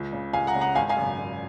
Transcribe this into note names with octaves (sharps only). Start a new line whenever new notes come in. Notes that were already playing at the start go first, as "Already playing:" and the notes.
Already playing: C#2
C#3
C#2 F5 G#5
F#5 A#5
C#3
F#5 A#5
G#1 F5 G#5
F5 G#5
F#2 C#3
G#1